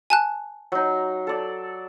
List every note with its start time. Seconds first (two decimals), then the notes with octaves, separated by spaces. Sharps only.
0.10 G#5 A5 F#6
0.72 F#3 D#4
1.27 A4 D5